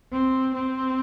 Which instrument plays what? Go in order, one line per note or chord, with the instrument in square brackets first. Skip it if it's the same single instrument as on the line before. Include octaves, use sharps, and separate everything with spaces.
[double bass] C4
C4